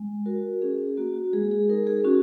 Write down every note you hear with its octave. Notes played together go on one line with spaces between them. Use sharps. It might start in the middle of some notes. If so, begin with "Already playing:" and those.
Already playing: G#3
F#4 A#4
C#4 G#4
A#3 F#4
F#4
G#3 G#4
G#4
D#4 A#4
G#4
C#4 F#4